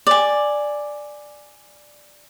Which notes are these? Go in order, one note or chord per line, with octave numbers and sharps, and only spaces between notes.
D5 G#5